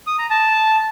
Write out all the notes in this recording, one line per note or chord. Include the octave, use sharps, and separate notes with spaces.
D#6
A#5
A5